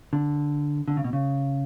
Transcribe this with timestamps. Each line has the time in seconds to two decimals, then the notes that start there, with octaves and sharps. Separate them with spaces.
0.13 D3
0.88 D3
0.97 C#3
1.04 B2
1.13 C#3